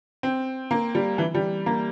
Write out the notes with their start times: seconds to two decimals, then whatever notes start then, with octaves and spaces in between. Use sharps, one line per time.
0.23 C4
0.71 A#3
0.95 G3
1.18 E3
1.35 G3
1.66 A#3